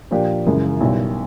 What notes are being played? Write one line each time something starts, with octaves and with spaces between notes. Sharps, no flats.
A#2 F3 A#3 D4 G4
F#2 C#3 E3 G#3
B1 B2 G3 B3 E4